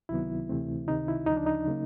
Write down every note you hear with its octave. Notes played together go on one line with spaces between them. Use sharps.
C#2 C3 D#3 F#3 B3 E4
D2 C3 E3 A3 C4
C#2 C3 D#3 D#4
E4
D2 C#3 F3 D#4
D4
D#4
C#3 F#3 A#3